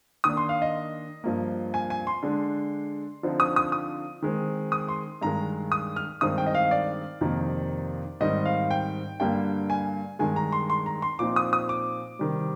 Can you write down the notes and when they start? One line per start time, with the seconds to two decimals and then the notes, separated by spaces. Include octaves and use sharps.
0.24 D#3 A#3 D4 D#6
0.37 C6
0.49 F5
0.62 D#5
1.24 G2 F3 A#3
1.74 G#5
1.90 G#5
2.07 C6
2.23 D3 G#3 D4
3.23 D3 F3 C4 D#4
3.40 D#6
3.56 D#6
3.72 D#6
4.22 D#3 G#3 C4
4.72 D#6
4.89 C6
5.22 G2 D#3 G#3 A#5
5.72 D#6
5.96 F6
6.21 G2 D#3 G#3 C4 D#4 D#6
6.38 G5
6.46 D#5
6.55 F5
6.71 D5
7.21 F2 C3 D#3 A#3 D#4
8.20 G#2 D#3 G3 C4 D#4 D#5
8.45 F5
8.71 G5
9.20 G2 D3 G3 A#3 G5
9.70 G#5
10.19 G2 D#3 G#3 G#5
10.36 A#5
10.52 C6
10.70 C6
10.86 A#5
11.02 C6
11.19 A#2 F3 C4 D#4 D6
11.36 D#6
11.53 D#6
11.69 D6
12.19 C3 D#3 G3